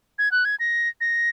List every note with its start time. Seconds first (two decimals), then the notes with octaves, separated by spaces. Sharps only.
0.18 G#6
0.31 F#6
0.45 G#6
0.60 A#6
1.01 A#6